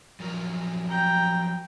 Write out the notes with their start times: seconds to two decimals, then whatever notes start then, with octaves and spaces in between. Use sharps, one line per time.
0.20 F3 F#3 A#4
0.89 G5 A#5